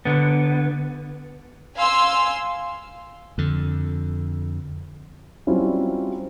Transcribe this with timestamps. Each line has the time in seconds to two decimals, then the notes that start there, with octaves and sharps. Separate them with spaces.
0.05 D3 B3
1.76 F5 G#5 C6 E6
3.38 F2 D3
5.47 F#3 G3 C4 C#4 E4 F4